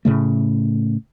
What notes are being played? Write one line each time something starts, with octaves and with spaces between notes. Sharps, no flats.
A2 C#3 A3